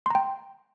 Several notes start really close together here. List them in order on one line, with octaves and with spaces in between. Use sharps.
C6 A#5 G5